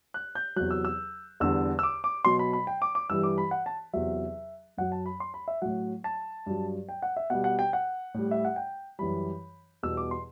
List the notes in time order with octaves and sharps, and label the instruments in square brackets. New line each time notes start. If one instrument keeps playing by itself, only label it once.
[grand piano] F#6
G6
E2 C3 F#3 F#6
E6
E6
E2 D3 G3 E6
E6
D6
D6
B2 F#3 C6
B5
B5
G5
D6
D6
G2 E3 G3 E6
D6
B5
F#5
A5
E2 C3 F#3 E5
F#2 F#3 F#5
A5
B5
C6
B5
E5
A2 F#3 F#5
A5
G2 F#3
G5
F#5
E5
B2 G3 F#5
F#5
G5
F#5
A2 G3
E5
F#5
G5
F#2 E3 G3 B5
E2 B2 G3 E6
D6
C6